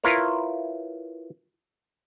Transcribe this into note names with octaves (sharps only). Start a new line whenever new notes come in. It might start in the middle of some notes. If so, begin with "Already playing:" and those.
E4 F4 A#4 B4 C#5